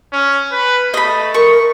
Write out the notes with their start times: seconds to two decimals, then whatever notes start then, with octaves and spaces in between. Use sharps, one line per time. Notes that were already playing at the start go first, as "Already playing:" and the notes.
0.13 C#4
0.52 B4
0.94 A3 D#5 B5
1.34 A#4 C#6